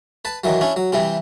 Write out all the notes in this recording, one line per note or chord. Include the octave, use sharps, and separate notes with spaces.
B4 A5
D#3 E3 F#3
C#4 D4 E4
F#3
C3 E3 G3 C4